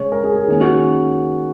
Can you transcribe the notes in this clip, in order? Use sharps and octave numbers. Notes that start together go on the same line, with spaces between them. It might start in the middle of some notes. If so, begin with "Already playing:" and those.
Already playing: C#3 G#3 C#4 C#5
A#4
G#4
G#4
D#3 A#3 C#4 G#4
F#4